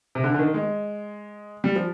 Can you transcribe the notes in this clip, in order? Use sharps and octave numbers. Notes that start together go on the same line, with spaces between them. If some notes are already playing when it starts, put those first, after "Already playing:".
C3
D3
D3
D#3
G#3
G3
F3